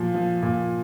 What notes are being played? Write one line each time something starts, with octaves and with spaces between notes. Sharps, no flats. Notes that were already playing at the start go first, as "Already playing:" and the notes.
Already playing: A#2 F3
F3
A#2